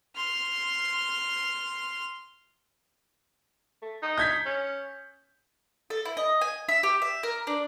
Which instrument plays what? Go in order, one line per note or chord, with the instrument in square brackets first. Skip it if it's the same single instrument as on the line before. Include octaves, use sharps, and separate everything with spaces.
[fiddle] C6 F6
[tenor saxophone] A3
D#4
[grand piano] G6 G#6 B6
[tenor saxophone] C#4
[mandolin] A4
E4
D#5
G#5
E5
G4
E5
A#4
D4